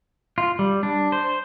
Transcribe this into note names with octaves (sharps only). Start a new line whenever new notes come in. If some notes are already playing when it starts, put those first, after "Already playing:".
F4
G3
D4
C5